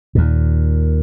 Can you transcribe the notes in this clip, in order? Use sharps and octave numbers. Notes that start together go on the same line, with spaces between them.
D#2 A#2